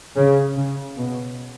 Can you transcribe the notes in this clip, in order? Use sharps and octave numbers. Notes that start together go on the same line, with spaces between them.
C#3
C#3
B2